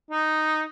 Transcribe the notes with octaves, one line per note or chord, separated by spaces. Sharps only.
D#4